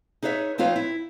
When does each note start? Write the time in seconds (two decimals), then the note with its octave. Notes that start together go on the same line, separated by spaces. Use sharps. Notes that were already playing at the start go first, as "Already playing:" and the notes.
0.23 D#4 G#4 B4 C#5 E5
0.58 F3 C4 D#4 F4 B4 C#5
0.76 E4